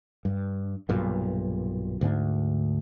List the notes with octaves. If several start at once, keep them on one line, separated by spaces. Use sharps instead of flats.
G2
B1 G2 A#2
D2 G#2 B3 D4